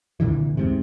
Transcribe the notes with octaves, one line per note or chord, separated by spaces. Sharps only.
C2 A#2 D3 E3
E2 G#2 C3